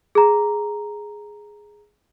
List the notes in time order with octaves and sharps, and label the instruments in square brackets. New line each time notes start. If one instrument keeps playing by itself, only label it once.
[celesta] G#4 A#5